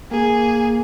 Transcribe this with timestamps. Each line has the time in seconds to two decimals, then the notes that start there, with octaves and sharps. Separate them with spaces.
0.11 A#3 G#4